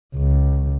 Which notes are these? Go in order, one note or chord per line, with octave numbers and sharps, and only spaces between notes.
C#2